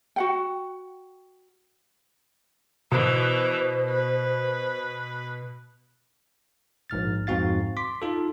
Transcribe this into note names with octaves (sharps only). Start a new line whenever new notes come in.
F#4 F#5 G5
B2 E3 B3 C5
B4
A#1 G#2 F6 A6
F2 G#2 C4 F#4 F5 A6
C6 D6 B6
D#4 F4 A4